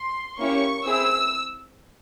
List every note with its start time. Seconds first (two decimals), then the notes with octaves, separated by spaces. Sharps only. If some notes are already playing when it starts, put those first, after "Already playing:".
Already playing: C6
0.38 A#3 C#4 E4 G4 C#6
0.85 C4 E4 G#4 E6